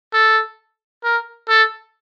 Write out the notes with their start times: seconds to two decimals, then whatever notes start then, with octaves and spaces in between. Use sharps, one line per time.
0.14 A4
1.04 A#4
1.49 A4